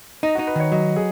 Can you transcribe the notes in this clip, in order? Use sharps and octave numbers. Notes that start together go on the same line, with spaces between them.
D#4 D#5
D#4 F#4
B4
D#3 C#5
F#3 D#5
G#4